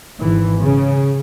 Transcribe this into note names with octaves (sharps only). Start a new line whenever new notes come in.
G#1 G#2 E3
C#3